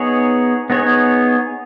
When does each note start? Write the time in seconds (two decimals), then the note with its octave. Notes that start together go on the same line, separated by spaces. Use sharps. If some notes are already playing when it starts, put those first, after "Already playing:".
Already playing: B3 D#4 G#4 C#5
0.70 B3 D#4 G#4 C#5